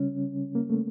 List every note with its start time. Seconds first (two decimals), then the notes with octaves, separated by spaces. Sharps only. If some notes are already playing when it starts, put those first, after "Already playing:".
Already playing: C#3 G3 C#4
0.55 A#3
0.70 A3